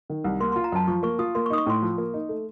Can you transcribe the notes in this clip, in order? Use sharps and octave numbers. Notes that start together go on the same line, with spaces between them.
D#3
C2
A#3 C6
C6
F4
A#5
F#2 A5
F3 C#6
A#3 C#6
F4 D#6
A#3 C6
C#6
D#4 D#6
C#6
A2 C6
F3
A#3
D#4
A3